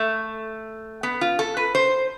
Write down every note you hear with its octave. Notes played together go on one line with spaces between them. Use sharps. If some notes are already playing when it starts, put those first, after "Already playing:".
Already playing: A3
B3
F4
A4
B4
C5